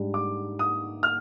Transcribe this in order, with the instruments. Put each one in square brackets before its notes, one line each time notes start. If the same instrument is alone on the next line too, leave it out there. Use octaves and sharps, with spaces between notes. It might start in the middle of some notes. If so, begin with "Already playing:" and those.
Already playing: [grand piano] G#2 G3 D4
D6
D#6
F6